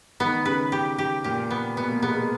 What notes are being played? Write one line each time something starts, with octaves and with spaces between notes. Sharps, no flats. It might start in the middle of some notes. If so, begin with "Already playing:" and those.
D#3 B3
C#3 B4
G4
G4
A#2 G4
B3
B2 B3
A#3
G#3 B3
G#3